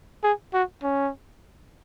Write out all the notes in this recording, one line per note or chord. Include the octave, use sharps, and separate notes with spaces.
G#4
F#4
C#4